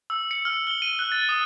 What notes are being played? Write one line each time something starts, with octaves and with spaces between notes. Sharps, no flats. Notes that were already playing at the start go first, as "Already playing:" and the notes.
E6
C#7
F6
G7
D#7
F#6
A6
D#6